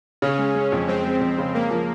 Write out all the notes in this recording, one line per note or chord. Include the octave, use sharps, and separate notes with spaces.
C#3 C#4
G#3
G#3
F2
G#3 C4
G#3
F2
C#3
G#3 A#3
F3